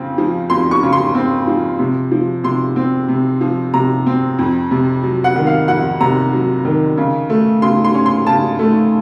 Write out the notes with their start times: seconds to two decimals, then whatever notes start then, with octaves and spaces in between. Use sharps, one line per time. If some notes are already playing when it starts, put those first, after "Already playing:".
Already playing: F2 C#3 C4
0.18 F3
0.50 F2 C6
0.71 C#6
0.83 C#3
0.93 C6
1.15 C4
1.47 F3
1.79 C3
2.12 F3
2.44 C3 C6
2.76 C4
3.08 C3
3.41 F3
3.74 C3 A#5
4.06 C4
4.39 F2
4.71 C3
5.03 F#3
5.24 F#5
5.36 D#3
5.47 F5
5.68 F2 F#5
6.00 C3 A#5
6.33 F#3
6.65 D#3
6.98 C#3
7.30 A3
7.62 C#3 C6
7.84 C6
7.94 C#4
8.06 C6
8.27 C#3 A5
8.59 A3